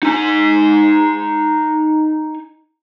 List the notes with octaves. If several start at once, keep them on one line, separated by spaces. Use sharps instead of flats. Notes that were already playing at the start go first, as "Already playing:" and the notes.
D#4 G#5